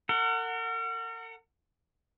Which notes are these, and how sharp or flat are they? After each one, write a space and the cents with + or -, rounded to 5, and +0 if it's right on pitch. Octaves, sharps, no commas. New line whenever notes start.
A#4 -40 F#5 +0